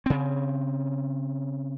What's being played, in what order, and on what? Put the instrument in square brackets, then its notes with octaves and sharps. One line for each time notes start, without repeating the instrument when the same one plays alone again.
[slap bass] C#3 C4